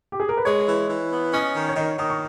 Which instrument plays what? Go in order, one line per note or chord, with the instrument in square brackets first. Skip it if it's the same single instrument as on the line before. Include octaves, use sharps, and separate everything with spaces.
[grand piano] G4
G#4
A#4
B4
[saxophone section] G#3 [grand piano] C#5
[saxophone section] E3
E3
B3
[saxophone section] C#4 [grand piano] D#5
[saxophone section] D#3
[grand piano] C#5
[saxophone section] D#3 [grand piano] D#5
[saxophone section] D#3 [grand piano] D#6
[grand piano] C#6